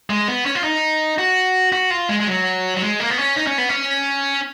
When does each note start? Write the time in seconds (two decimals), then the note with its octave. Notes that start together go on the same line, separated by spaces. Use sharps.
0.10 G#3
0.28 B3
0.46 C#4
0.55 F4
0.64 D#4
1.18 F#4
1.73 F#4
1.90 F4
2.09 G#3
2.20 G#3
2.27 F#3
2.77 F#3
2.82 G#3
3.00 A#3
3.10 B3
3.18 C#4
3.36 D#4
3.47 C#4
3.58 B3
3.69 C#4